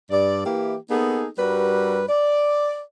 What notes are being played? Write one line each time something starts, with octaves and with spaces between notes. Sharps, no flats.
G2 D5
E3 A#3 E4 G4
A#3 B3 D#4 G#4 A4
G2 G3 F#4 A#4 B4
D5